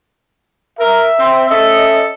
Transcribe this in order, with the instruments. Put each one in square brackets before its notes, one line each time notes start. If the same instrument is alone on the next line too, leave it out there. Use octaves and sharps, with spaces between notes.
[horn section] A#4 [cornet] E5
[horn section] C4
[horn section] C#4 A4 D#5 [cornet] E5